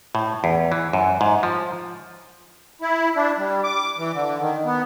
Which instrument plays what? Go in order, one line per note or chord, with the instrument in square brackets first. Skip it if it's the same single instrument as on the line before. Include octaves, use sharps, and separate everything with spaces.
[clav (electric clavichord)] A2
E2
E3
F#2
G#2
F3
[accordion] E4
D4
G3
D6
E3
D3
D#3
B3